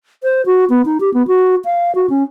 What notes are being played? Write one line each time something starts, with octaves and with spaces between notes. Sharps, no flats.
C5
F#4
B3
D#4
G4
B3
F#4
F5
F#4
C#4